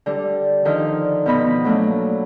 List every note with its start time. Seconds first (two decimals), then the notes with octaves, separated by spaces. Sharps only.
0.06 D3 G3
0.65 D3 D#3 F3
1.26 B2 F3 B3 D#5 B5
1.65 F#3 A3 A#3 D4